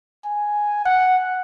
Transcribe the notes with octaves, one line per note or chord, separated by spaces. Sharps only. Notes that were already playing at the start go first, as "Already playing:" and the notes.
G#5
F#5